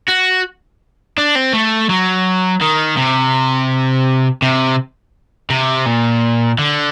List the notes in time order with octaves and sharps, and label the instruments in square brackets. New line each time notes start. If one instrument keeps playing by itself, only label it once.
[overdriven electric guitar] F#4
D4
C4
A3
F#3
D#3
C3
C3
C3
A#2
D3